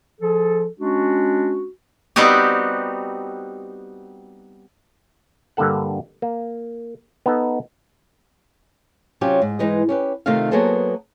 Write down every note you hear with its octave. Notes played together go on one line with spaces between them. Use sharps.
F3 G#4 A4
G#3 C#4 D4 F#4
G3 B3 C4 D#4 F#4 G4
G2 D3 A#3 A4 F#5
A#3
B3 D#4 A4
C3 F#3 C#4 F4 G4
G#2
G#2 E3 G#3 D#4 B4 D#5
C#4 G4 B4
C3 D#3 A3 D#4 F4 F5
F#3 A#3 B3 G#4 A4 C5